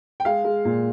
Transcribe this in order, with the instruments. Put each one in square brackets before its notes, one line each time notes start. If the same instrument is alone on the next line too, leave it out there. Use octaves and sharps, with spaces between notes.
[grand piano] G5
G#3 F5
G#3
A#2